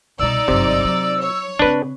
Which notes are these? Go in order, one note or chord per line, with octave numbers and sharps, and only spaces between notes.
C2 B2 D#4 D5 E6
G1 F#2 C3
F#3
C#5
C#3 C4 D4 B4